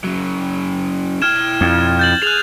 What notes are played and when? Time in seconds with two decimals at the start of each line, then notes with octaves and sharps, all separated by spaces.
0.04 C#3 F#3
1.22 E4 G5 F6 G#6 E7
1.61 F2
1.99 G6 A6 F#7
2.23 G#4 F#6 F7